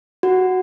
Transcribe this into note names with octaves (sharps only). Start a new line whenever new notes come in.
F#4